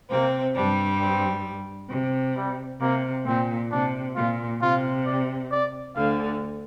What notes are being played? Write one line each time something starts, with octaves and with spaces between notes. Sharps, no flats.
C3 A#3 C4
G2 G3 D4
C4
C3
G3
C3 A#3
A#2 C4
C3 D4
A#2 F4
C3 F4
D5
D5
D2 D3 F5